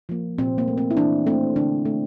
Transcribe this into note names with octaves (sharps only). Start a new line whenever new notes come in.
F3 A#3
A#2 C4
A#3
A3
C4
E4
E3 D4
A3 C4
D3 D4
A3